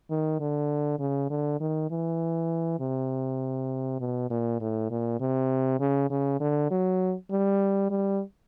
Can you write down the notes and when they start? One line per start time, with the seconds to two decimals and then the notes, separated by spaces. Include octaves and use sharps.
0.10 D#3
0.40 D3
1.00 C#3
1.30 D3
1.60 D#3
1.91 E3
2.80 C3
4.00 B2
4.30 A#2
4.61 A2
4.91 A#2
5.20 C3
5.80 C#3
6.10 C#3
6.40 D3
6.71 F#3
7.31 G3
7.90 G3